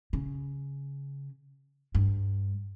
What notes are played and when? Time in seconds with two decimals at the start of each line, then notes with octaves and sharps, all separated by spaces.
0.13 C#3
1.95 G2